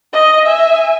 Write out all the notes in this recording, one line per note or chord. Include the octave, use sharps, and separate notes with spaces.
D#5
E5 G#5